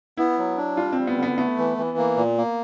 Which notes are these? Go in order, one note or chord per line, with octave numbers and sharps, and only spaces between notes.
B3 E4
F#3
D4
G3 F4
C4
G3
B3
D3
B3
A3 B3
E3
E3
A#3
A#2
A#3